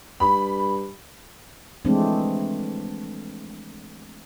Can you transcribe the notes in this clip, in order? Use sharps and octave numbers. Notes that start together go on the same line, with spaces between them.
G2 B5
E3 F3 G#3 A3 C4 D4